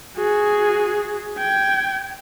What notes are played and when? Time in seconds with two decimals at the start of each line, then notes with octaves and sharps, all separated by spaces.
0.17 F#4 G#4
1.38 G5 G#6